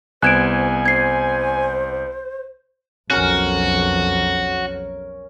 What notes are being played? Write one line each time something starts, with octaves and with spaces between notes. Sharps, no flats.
C2 B3 C5 G#5 F#6 G#6 D7 E7
C5 G#6 C7
B1 F2 C#4 F#4 A#4